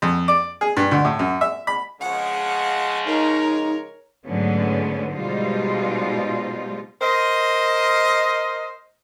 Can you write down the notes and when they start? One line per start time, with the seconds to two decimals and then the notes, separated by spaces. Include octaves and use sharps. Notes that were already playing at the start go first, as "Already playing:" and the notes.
0.02 F2
0.28 D5
0.61 G#4
0.77 G2
0.91 D2
1.05 A2
1.19 F#2
1.41 E5
1.67 B5
2.01 C#3 F3 G#3 F#5
3.06 D#4 A#4 C#5
4.26 G#2 D3 F#3 A3 B3 C#4
5.15 B2 G3 G#3 D#4 F4 C5
7.02 A#4 C5 D#5